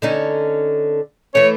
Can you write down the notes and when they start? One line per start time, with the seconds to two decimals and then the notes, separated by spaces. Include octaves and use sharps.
0.02 D3 C#4 D#4
1.35 E3 A3 C#5